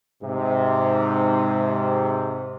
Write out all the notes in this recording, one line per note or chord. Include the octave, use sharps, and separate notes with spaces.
G#2 C3